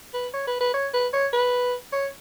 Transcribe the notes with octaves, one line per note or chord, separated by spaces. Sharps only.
B4
C#5
B4
B4
C#5
B4
C#5
B4
C#5